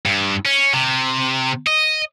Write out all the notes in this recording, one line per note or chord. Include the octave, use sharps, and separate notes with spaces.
G2
C#4
C3
D#5